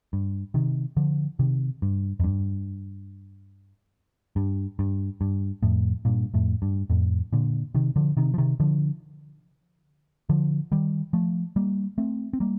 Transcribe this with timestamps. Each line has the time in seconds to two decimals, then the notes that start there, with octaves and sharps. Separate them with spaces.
0.13 G2
0.54 C3 D#3
0.97 D3 F3
1.39 C3 D#3
1.82 G2
2.20 F2
2.24 G2
4.36 G2
4.79 G2
5.21 G2
5.63 F2 A2
6.05 G2 A#2
6.34 F2 A2
6.62 G2
6.90 F2 A2
7.33 A#2 D3
7.75 C3 D#3
7.96 D3 F3
8.17 C3 D#3
8.34 F3
8.38 C3 D#3
8.60 D3 F3
10.29 D3 F3
10.72 D#3 G3
11.13 F3 A3
11.56 G3 A#3
11.98 A3 C4
12.33 C4
12.40 G3 A#3